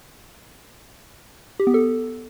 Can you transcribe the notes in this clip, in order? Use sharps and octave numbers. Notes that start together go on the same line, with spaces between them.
G4
B3
A4